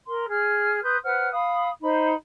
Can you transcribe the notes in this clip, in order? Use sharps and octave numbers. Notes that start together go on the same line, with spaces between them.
A#4 C6
G#4 F6
B4 C6 D#6 G6
B4 C5 F#5 F6
F5 B5 D#6
D#4 C5 B5